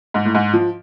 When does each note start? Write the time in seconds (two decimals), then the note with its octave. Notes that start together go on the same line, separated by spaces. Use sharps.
0.14 G#2
0.25 A2
0.35 G#2
0.53 F3